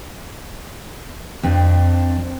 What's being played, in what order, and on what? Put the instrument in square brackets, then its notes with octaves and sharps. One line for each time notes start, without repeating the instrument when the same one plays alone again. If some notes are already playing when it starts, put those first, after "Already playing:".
[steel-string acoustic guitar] F2 C4 D4